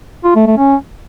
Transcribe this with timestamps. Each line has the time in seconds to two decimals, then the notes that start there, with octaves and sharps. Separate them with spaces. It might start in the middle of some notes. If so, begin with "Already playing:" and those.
0.24 F4
0.36 A3
0.47 A3
0.58 C#4